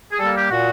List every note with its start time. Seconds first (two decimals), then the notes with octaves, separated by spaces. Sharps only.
0.11 G#4
0.19 G3 A#3 A4
0.35 G4
0.50 A#2 F#4